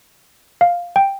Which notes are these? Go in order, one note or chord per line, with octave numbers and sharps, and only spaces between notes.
F5
G5